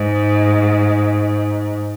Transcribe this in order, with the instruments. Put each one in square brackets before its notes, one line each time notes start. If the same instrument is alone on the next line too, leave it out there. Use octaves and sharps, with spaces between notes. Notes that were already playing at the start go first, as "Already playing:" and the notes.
Already playing: [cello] G#2